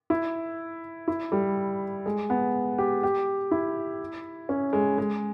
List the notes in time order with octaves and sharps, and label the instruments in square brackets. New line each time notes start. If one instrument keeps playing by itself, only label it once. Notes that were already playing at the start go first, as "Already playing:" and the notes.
[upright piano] E4
E4
G3
G#3
B3
G4
G4
E4
C#4
G#3
G#3